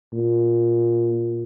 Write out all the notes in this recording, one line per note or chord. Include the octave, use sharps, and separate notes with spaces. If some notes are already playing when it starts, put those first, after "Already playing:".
A#2